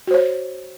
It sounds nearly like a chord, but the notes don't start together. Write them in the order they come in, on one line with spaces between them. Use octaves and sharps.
F#4 C5 C#5